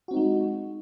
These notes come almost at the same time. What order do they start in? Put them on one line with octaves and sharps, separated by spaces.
F#4 C4 D#4 G#3